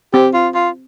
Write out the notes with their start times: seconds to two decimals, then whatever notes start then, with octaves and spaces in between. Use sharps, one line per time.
0.14 C4 G4
0.34 F4
0.55 F4